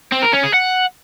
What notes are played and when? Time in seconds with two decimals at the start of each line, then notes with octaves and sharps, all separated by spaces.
0.12 C4
0.23 A#4
0.33 C#4
0.43 G#4
0.54 F#5